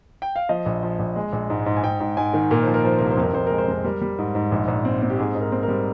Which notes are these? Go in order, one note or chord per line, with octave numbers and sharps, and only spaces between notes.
G5
F5
F3 D#5
A#1
F3
A#1
G#3
A#1
G#2
G#2
G#5
G#2 G5
G#2
G#2 G#5
D#3
A#2 A#4
F3 C5
A#4
F3 C5
C2 A#4
C5
F2
A#4
F2 C5
G#3 A#4
C5
F2 A#4
G3 A#4
G3
G#2
G#2
A#1
A#1
C4
C4
G4
G#2 G#4
G#2
A#4
C4
A#4
G3